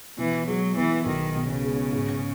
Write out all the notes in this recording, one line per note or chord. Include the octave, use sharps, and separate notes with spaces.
B2 E3
F#3 G#3
E3 B3
B1 D#3
B2
C#3
G#3
G#2